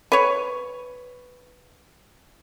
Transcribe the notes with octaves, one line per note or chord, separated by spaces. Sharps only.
B4 C#5